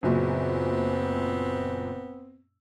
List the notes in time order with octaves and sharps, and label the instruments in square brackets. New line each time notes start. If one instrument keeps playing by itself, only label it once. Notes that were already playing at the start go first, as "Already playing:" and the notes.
[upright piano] F#1 F#2 A#2 [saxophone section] B3 C4